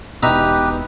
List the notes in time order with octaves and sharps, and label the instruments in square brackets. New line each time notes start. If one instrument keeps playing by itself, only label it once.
[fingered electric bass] E1 B2 [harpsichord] D#4 E5 A#5 [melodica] G4 B4